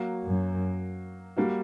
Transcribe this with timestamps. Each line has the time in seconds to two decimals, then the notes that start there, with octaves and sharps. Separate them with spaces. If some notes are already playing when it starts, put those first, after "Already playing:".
Already playing: F#3 A#3 F#4
0.24 F#2
1.36 G3 A#3 F#4